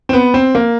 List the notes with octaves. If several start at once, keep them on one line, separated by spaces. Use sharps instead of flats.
C4
B3
C4
A#3